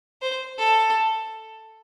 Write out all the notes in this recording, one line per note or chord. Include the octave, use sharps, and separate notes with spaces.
C5
A4